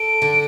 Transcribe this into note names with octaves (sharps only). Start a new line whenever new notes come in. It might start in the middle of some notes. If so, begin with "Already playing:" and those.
Already playing: A4 D7
D3